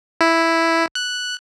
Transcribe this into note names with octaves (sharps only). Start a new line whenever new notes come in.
E4
F#6